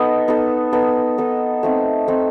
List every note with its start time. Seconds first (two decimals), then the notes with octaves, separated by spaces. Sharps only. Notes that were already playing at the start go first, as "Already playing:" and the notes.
Already playing: B3 D#4 A4 D#5
0.28 B3 D#4 A4 D#5
0.73 B3 D#4 A4 D#5
1.18 B3 D#4 A4 D#5
1.63 A3 C4 D#4
2.08 A3 C4 D#4